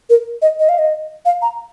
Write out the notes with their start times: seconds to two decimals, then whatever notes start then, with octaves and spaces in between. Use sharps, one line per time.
0.10 A#4
0.42 D#5
0.60 D#5
0.69 F5
0.78 D#5
1.25 F5
1.42 A#5